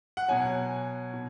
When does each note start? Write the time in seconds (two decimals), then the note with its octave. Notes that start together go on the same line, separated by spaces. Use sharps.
0.17 F#5
0.28 B2 F#3 G#5
1.14 B2